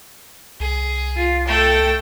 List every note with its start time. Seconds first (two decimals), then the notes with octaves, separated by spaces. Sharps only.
0.60 C2 G#4
1.17 F4
1.48 A3 A4 G5